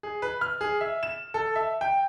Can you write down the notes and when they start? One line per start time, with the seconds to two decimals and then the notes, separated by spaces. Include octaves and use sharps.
0.03 G#4
0.22 B4
0.41 F6
0.61 G#4
0.81 E5
1.03 E7
1.34 A4
1.56 E5
1.81 G5